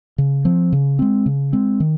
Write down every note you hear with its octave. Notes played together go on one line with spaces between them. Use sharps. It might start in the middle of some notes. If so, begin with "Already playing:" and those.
C#3
F3 C4
C#3
G#3 C4
C#3
G#3 C4
D#3